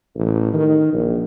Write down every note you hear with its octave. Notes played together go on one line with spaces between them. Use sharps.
A1
D#3
A#1